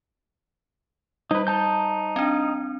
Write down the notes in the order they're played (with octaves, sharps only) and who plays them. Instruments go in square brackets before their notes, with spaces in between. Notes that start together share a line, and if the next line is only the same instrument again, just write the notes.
[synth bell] G3 [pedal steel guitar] D#4 B4
[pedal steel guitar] D#4 A5 G6
[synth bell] C4 D4